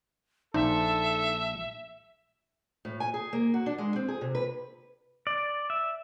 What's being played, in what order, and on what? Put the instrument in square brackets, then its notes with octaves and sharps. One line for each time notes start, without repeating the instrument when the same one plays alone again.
[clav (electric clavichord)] A#1 D4 C5 [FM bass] D#4 [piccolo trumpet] A4 [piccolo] E5
[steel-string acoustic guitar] A2
G#5
G#4
A#3
F#4
D4
G#3
C4
G#4
C3
B4
[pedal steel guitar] D5
E5